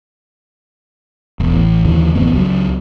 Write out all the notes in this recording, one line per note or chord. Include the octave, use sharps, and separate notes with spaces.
E1 B2
A1
D#2 D3 E3
A1 F2 B3 C4
C#2 F#3